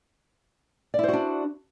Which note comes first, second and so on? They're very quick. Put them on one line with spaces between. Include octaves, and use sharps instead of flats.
D5 E4 C5 F#4 D4